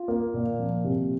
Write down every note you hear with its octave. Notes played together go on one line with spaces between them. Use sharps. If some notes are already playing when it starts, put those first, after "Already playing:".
Already playing: F4
A#3
A#2
F3
C3